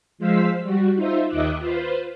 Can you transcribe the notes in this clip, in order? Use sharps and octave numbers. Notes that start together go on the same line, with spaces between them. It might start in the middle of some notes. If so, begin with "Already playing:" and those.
F3 G#3 C5 F5 E6 B6
G3 F#4
D#4 F4 C5 E5
D#2 D#3 D#5 E5 D6 F#6
F4 B4 C5